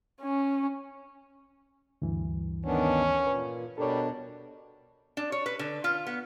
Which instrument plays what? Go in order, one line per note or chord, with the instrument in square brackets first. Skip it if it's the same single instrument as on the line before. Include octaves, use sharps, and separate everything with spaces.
[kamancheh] C#4
[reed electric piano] D2 G2 E3
[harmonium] D#3 B3 D4 [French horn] C#4
[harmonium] A#2 [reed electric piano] B4
[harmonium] B2 D4 [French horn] G3 [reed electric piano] A4 A#4 C#5
[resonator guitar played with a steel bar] D4
C#5
B4
D3
F4
B3